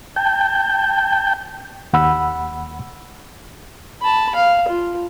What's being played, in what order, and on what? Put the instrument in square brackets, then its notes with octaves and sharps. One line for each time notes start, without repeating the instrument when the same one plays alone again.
[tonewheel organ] G5 A5 G6
[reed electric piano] D#2 F#5 B5 E6
[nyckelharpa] A5 B5
F5
F4